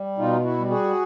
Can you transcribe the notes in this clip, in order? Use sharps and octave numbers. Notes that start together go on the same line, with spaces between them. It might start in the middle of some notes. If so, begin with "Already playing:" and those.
Already playing: G3
B2 D#4 F4
E4 F#4
G3
F#4 G#4